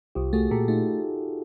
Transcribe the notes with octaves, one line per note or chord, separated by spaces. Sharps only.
C2 F4 G4
A3 F#4 G#4
A#2 G4 A4
A3 D#4 F4